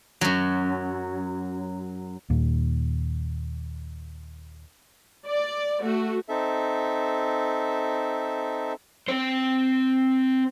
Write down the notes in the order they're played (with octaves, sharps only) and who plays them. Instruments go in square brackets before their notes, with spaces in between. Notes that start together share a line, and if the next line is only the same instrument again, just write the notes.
[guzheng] F#2 F#3
[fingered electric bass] D#2 A#2
[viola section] D5
A3 F#4
[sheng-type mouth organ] C4 D#4 A4 E5
[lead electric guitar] C4 C5